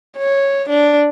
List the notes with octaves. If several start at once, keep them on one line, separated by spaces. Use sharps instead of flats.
C#5
D4